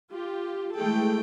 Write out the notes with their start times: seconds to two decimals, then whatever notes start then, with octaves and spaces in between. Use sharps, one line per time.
0.12 F4 G4
0.76 E3 G#3 A3 G#4 A4 G5